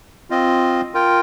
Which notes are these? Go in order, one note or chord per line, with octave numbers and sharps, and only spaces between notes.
C4 F4 D#5
F4 A#4 G5